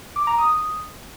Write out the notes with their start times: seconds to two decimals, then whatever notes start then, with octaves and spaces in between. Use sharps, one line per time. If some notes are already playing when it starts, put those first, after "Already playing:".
0.16 D6
0.27 A#5
0.38 D#6
0.49 D#6